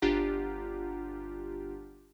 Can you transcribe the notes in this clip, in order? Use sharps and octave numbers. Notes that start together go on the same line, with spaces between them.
G1 D4 F4 G4 F#5 A#5